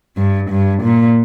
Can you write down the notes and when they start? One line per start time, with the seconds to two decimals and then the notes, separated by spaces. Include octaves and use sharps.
0.17 G2
0.51 G2
0.84 A#2